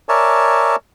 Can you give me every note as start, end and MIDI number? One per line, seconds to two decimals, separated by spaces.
0.09 0.76 70
0.09 0.76 73
0.09 0.76 74
0.09 0.76 76
0.09 0.76 80
0.09 0.76 81